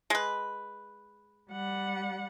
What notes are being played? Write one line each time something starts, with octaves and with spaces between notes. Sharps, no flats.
G#3 B4
G3 F#5